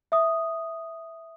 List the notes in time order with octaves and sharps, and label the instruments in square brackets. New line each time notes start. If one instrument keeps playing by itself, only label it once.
[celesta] E5 D#6